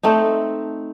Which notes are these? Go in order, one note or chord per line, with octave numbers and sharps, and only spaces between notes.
A3 C4 D#4